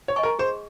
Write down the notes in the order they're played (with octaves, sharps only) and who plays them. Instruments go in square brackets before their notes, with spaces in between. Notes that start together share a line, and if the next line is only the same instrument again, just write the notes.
[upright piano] C#5
[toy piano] D#5 G#5 C#6
[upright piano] A#4
[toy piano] G#4 [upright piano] C5